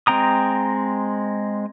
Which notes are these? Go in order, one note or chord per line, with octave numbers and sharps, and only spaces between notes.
G#3 C4 G5 A#5 D#6